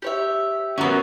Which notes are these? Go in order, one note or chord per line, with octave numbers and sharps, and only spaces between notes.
G4 C#5 E5
F#3 B3 C#4 F#4 A#4